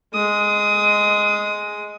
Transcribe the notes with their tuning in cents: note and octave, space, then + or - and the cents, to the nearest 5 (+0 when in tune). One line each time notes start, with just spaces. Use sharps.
G#3 +0 D#6 +20